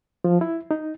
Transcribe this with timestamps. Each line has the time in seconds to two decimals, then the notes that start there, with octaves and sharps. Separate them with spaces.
0.24 F3
0.41 E4
0.71 D#4